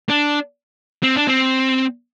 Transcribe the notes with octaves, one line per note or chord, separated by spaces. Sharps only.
D4
C4
D4
C4